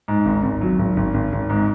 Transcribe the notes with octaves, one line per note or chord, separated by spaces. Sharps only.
G#2
G#1
G#1
F#3
G#1
G#1
G#1
G#1
G#2